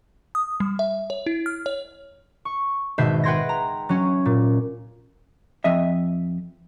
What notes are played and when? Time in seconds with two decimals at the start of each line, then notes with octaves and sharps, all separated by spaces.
0.35 D#6
0.60 G3
0.79 E5
1.10 C#5
1.26 E4
1.46 F6
1.66 C#5
2.45 C#6
2.98 G#1 B2 E5 G6 C7
3.24 B4 F#5 G5 C6 G#6 A#6
3.49 A#5
3.89 F#3 C#4
4.25 A#2
5.64 F2 D#5 E5